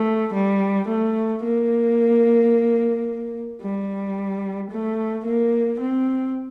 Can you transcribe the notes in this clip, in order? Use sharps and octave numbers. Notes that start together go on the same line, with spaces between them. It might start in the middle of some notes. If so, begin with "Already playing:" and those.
Already playing: A3
G3
A3
A#3
G3
A3
A#3
C4